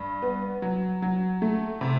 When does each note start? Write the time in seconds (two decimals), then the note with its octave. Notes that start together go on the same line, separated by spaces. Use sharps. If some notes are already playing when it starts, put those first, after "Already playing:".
Already playing: G2
0.22 B3
0.62 F#3
1.02 F#3
1.42 A3
1.81 C3